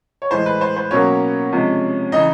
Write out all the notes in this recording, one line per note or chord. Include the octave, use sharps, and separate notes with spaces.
C#5
A2 E3 G#3 C5
B4
C5
C5
B2 F#3 A#3 C#4 C#5
C3 F3 G#3
C#3 E3 D#4 D#5